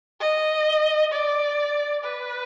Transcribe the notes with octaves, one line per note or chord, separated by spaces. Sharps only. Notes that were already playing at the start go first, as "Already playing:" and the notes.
D#5
D5
B4